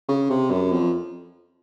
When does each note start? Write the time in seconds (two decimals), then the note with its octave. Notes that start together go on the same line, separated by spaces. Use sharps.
0.09 C#3
0.30 C3
0.51 F#2
0.72 F2